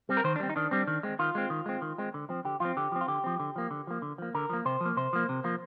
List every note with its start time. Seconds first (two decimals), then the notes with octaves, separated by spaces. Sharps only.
0.09 G3 C4
0.17 A#4
0.24 D#3 C5
0.36 D4
0.40 G3 C4
0.49 D#4
0.56 D#3 D4
0.71 G3 C4
0.87 D#3
1.03 G#3 C4
1.19 D#3 F4
1.35 G#3 C4
1.50 D#3
1.66 G#3 C4
1.82 D#3
1.98 G#3 C4
2.14 D3
2.29 F3 C4
2.45 D3 G4
2.60 F3 C4 F4
2.77 D3 G4
2.92 F3 C4
3.01 F4
3.08 D3 G4
3.24 F3 C4
3.40 D3
3.56 F3 A#3
3.71 D3
3.87 F3 A#3
4.02 D3
4.18 F3 A#3
4.35 D3 A#4
4.50 F3 A#3
4.65 C3 C5
4.81 F3 A#3
4.97 C3 C5
5.13 F3 A#3
5.29 C3
5.44 F3 A#3